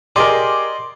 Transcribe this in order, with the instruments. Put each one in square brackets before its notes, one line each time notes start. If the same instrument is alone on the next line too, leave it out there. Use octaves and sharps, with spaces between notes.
[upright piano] G4 G#4 A#4 [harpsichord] D5 D#5 [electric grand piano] C6 D6